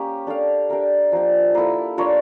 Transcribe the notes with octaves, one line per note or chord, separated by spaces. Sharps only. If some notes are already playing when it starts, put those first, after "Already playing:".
Already playing: A#3 C#4 G4 C#5
D4 A4 D5 F5
D4 G4 A#4 E5
F3 A#3 D4 G4
A#3 E4 A4
D4 F4 A#4 C#5